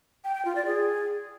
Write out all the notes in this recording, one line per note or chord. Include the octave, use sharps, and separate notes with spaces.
G5
G5
F4
D5
G#4